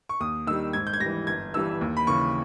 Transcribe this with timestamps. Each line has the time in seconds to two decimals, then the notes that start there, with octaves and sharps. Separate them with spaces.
0.09 C#6
0.20 D#2 D#6
0.47 D#3 G3 E6
0.73 G#2 G#6
0.87 G6
0.93 G#6
1.00 G3 A#6
1.06 E3
1.27 G1 G#6
1.54 G2 E3 G3 E6
1.81 D#2
1.97 B5
2.07 C#3 E3 C#6